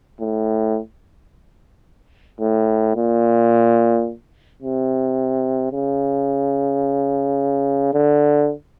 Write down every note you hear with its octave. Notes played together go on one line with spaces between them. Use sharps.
A2
A2
A#2
C3
C#3
D3